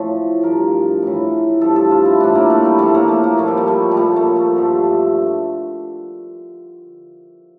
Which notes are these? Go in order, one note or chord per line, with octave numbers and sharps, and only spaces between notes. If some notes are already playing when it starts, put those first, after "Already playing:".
Already playing: A2 F3 C#5
G2 F3 A#4
A2 E3
G2 F3 A4
A4
F4
E4
A2 E3 D4
A#3
A3
G3
A2 F3 A3
A#3
A3
A#3
A#2 F3 A3
G3
A3
G3
G3
A#2 F3 A3
A3
A3
G2 D3 F3